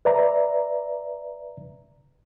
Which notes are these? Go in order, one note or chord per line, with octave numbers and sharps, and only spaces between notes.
B4 D5 E5 A#5